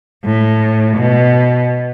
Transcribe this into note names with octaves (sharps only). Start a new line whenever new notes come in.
A2
B2